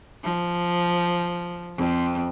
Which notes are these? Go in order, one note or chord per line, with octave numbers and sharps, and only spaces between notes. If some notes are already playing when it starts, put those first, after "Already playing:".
F3
F2